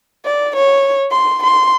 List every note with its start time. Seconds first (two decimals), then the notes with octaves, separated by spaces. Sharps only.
0.25 D5
0.56 C#5
1.11 C6
1.43 C6